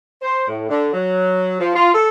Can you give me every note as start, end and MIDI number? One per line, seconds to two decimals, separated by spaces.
0.22 0.44 72
0.48 0.68 45
0.69 0.89 50
0.92 1.59 54
1.60 1.74 53
1.75 1.88 65
1.94 2.08 69